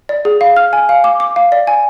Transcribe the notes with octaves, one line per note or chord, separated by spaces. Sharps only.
D5
G#4
F5
F6
G#5
F5
D6
D6
F5
D5
G#5